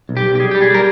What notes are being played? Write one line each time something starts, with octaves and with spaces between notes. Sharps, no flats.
B1
G4
B1
G4
G3 G#4
G3 G4
G#4
G3 A#4